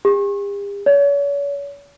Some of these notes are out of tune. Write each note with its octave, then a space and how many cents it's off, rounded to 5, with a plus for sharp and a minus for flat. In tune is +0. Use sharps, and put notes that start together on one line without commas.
G4 +45
C#5 +40